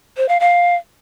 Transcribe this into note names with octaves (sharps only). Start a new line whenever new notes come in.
C5
F5
F5